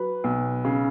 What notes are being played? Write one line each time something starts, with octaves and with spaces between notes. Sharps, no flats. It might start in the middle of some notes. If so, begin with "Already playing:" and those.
Already playing: F#3 B4
B1
C#3